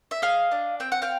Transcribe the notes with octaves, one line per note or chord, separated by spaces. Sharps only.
E5
G#4 D#5 F5
D4
C4 G5
F#5
F5 G5